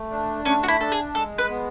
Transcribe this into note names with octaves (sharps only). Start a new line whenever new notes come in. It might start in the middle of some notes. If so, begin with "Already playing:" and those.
Already playing: A3
D4
A3 C#4
F#4
E4
D4 A4
G#4
G#3 A4
B4
B3